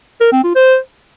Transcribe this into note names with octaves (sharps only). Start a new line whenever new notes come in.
A#4
C4
F4
C5